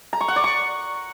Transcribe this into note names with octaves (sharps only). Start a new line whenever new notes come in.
A#5
C#6
F#5
D5
C#6